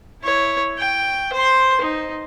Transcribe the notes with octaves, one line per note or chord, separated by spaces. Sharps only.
E4 C#5
G5
C5 C6
D#4